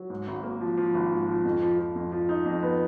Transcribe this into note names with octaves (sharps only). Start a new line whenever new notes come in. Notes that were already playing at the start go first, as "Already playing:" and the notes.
Already playing: F#3
G#2
G#1
A#3
F3
F3
G#1
G#2
F3
F2
F3
F3
F2
F3
D#4
F2
B3